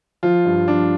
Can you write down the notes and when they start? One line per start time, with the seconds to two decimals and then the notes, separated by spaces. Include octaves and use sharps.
0.23 F3 F4
0.45 G2
0.67 F3 D4